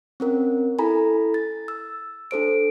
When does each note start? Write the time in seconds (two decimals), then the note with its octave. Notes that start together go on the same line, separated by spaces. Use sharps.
0.20 C4 C#4 A#4
0.79 E4 A4 G#5 A#5 B5
1.34 A6
1.68 E6
2.31 D4 A4 C5 D7